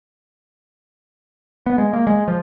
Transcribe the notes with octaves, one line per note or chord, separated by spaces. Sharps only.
B3
G#3
A#3
G#3
F3